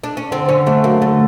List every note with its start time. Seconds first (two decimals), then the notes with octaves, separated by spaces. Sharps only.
0.03 D4
0.17 C#4
0.31 D3 C4
0.49 D3 C#4
0.67 A3 D4
0.84 F#3 A#3
1.02 D3 A3